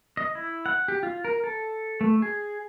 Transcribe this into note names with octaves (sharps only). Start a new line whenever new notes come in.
D#5
E4
F#5
G4
F4
A#4
A4
A3
G#4